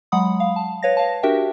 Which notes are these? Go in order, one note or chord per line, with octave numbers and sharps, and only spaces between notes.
F#3 G#3 F#5 B5 D#6
F5
A5
B4 C#5 F5 A#6
F5 A5
D4 F#4 G4 A#4 E5 G5